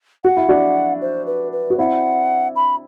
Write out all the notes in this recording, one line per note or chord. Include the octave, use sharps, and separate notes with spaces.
F#4 F#5
E4
D4 F#4
C5
B4
B4
F#4
C4 E4 F#5
B5